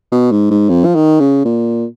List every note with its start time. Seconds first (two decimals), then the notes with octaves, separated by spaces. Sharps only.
0.12 B2
0.32 G#2
0.51 G#2
0.69 F2
0.85 F3
0.95 D#3
1.20 C#3
1.45 A#2